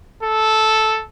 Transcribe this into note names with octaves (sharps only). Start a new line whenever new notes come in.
A4